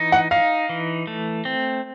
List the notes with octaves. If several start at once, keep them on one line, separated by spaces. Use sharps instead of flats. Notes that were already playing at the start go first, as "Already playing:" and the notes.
Already playing: E3 D#4
F#5
D#4 F5
E3
A3
C4